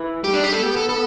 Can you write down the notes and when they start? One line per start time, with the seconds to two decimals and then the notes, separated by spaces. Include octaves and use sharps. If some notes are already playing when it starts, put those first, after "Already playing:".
Already playing: E3
0.24 G3 G4
0.33 D4
0.44 G4
0.52 A4
0.63 B3 G4
0.76 A4
0.89 A4